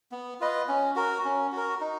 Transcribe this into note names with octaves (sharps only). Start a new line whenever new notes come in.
B3
F4 B4 D#5
C#4
F#4 A#4
C#4
F#4 A#4
D#4